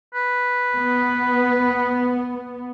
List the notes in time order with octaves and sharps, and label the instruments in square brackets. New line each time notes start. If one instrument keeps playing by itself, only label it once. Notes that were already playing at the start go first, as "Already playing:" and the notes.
[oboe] B4
[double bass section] B3